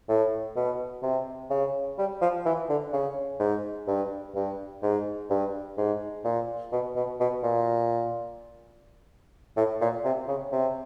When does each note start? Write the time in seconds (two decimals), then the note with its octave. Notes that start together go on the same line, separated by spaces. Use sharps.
0.09 A2
0.56 B2
1.03 C3
1.50 C#3
1.98 G3
2.21 F3
2.46 E3
2.69 D3
2.93 C#3
3.40 G#2
3.87 G2
4.35 G2
4.83 G#2
5.30 G2
5.78 G#2
6.24 A#2
6.72 B2
6.96 B2
7.20 B2
7.43 A#2
9.57 A2
9.81 A#2
10.04 C3
10.28 C#3
10.52 C3